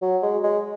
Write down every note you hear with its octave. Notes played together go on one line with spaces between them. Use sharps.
F#3
G#3
G#3